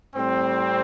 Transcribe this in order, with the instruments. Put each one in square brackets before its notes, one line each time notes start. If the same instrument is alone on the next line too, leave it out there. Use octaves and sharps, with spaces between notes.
[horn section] A2 G3 C4